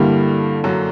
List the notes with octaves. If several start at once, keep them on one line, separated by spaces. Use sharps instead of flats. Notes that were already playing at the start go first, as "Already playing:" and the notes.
Already playing: G2 D3 G3 A#3 E4
F#2 F#3